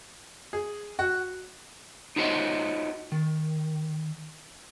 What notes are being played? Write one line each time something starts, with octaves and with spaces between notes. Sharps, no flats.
G#4
F#4
D#4 F4 F#4 C5 C#5 D#5
D#3